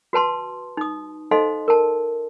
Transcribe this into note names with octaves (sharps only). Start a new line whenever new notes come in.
F#4 B4 A5 C6
D#4 D#6
D#4 A4 C5 D#5 F5 C6
A#4 A5